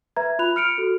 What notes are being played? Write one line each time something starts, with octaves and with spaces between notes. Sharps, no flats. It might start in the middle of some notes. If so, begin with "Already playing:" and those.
B4 E5 A#5 G#6
F4 B5 F#6 F7
F6 C#7 D7 F7
F#4 A4